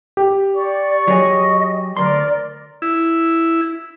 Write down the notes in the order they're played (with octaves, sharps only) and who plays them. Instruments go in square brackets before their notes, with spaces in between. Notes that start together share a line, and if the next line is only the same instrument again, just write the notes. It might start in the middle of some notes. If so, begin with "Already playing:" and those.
[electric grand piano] G4
[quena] D5 [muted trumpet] C#6
[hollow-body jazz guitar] F#3 G#4 [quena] D#5
[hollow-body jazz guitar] D2 C6 [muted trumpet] A#4 [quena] D5
[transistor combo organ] E4